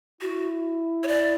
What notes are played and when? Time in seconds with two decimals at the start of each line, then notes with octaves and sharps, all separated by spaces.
0.21 E4 F#4
1.03 C#5
1.08 D5